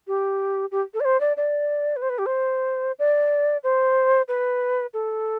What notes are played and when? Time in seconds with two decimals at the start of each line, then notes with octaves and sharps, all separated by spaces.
0.07 G4
0.71 G4
0.94 A4
1.00 D5
1.05 C5
1.20 D5
1.37 D5
1.96 B4
2.02 C5
2.10 B4
2.18 G4
2.26 C5
2.99 D5
3.64 C5
4.28 B4
4.94 A4